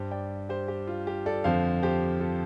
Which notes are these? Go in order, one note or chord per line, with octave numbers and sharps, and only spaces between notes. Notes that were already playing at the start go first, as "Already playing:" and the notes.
Already playing: G2 G3 G4 C5
D5 G5
G4 C5
G4
F4
G4
A4 D5
F2 D3 F3 C5 F5
G4 C5
F4 A4